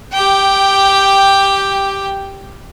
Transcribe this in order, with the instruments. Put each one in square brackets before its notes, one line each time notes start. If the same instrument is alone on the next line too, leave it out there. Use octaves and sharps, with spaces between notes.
[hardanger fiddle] G4 G5